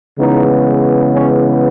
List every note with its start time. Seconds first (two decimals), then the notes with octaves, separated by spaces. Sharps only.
0.19 C#3 E3 G#3 B3 D#4
1.14 C#4